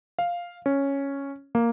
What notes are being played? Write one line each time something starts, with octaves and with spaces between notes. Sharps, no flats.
F5
C#4
A#3